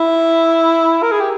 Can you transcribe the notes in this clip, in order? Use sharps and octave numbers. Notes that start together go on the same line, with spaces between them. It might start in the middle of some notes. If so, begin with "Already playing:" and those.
Already playing: E4
A#4
G#4
G4